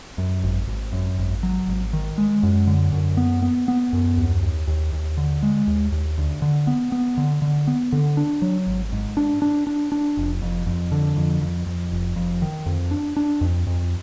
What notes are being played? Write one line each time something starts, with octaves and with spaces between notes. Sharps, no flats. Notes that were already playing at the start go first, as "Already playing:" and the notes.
F#2
G#1
G#1
F#2
G#1
F#3
G#1
D#3
G#3
F#2
D3
F#2
B3
B3
B3
F#2
D#2
D#2
D#2
D#2
D3
G#3
D#2
D#2
D2
D3
B3
B3
D3
D3
B3
D3
D4
F#3
G#1
G#2
D4
D4
D4
D4
F1
F2
F2
D3
F2
F2
F2
F1
F2
D#3
F2
D4
D4
F2
F2